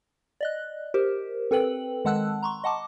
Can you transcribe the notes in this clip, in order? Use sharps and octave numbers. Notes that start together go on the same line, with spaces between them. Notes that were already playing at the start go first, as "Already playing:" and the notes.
D5 D#5 F#6
G4 A#4 C5
C4 A4 B4 G5 F#7
D#3 G#3 F#5 A5 E6 F#6
A#5 C6 C#6
D#5 F#5 A5 D6